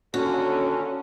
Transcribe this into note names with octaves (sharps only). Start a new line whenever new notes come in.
D#2 D3 C#4 F#4 A4